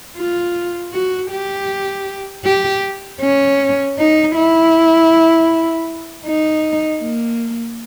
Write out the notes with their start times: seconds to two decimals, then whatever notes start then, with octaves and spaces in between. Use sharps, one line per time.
0.17 F4
0.93 F#4
1.31 G4
2.45 G4
3.22 C#4
3.98 D#4
4.35 E4
6.26 D#4
7.01 A#3